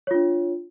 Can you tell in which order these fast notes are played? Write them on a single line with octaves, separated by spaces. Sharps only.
C#5 F4 D4